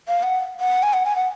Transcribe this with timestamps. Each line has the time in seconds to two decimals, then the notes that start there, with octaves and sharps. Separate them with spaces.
0.08 F5
0.23 F#5
0.60 F#5
0.83 G#5
0.93 F#5
1.05 G#5
1.16 F#5